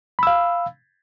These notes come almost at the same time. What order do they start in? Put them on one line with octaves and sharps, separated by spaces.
B5 E6 F5